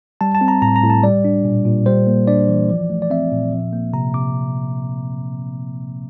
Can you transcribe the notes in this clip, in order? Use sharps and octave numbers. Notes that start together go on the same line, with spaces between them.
G3 A5
A5
C4
A#5
A2 A#5
A#5
A2
A5
G3 D5
D4
A#2
A#2
G3 C5
A#3
D4 D5
E3
F3
A3
D5
C4 E5
A#2
F3
A#3
C3 A#5
C3 D6